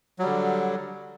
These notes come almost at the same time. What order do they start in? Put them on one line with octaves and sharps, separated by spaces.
F#3 G3 D3